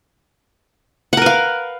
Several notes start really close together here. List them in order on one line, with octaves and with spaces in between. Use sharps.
F#5 A#4 B4 F5